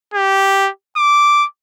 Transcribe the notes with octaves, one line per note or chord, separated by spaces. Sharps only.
G4
D6